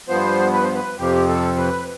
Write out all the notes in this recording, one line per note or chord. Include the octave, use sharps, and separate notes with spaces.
G2 F3 B3 C5
B4
C5
B4
F2 C3 F3 C4 G4
A4
B4